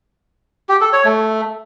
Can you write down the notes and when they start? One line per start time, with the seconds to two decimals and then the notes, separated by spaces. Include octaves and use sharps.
0.69 G4
0.81 A4
0.93 C#5
1.05 A3